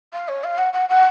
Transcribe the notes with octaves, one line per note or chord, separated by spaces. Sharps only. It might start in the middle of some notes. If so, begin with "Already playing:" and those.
F5
C#5
F5
F#5
F#5
F#5